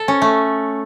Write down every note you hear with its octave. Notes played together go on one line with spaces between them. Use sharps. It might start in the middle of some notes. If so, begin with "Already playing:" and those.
Already playing: A4
C#4
A3